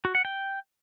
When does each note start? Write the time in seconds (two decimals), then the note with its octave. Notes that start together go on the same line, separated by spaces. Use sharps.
0.05 F#4
0.15 F#5
0.25 G5